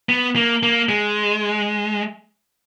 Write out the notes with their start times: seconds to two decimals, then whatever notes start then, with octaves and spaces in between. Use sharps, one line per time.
0.09 B3
0.36 A#3
0.63 A#3
0.89 G#3